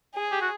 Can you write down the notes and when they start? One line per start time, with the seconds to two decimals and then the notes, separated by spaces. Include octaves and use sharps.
0.15 G#4
0.32 G4
0.41 F#4